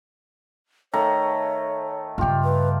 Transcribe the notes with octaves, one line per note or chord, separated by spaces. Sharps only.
D#3 A3 C#5 A#5
G2 C#3 F4 G4
B4